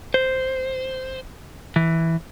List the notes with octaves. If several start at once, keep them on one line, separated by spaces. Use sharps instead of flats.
C5
E3